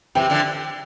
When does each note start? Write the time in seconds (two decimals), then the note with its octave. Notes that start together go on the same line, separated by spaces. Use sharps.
0.15 C3 E3 G5
0.30 D3 F3